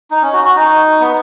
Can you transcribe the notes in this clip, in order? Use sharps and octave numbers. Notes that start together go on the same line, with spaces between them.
D#4
C#4
F#4
F#4
D#4
B3